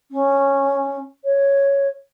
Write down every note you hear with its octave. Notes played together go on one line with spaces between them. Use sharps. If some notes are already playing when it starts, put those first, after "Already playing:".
C#4
C#5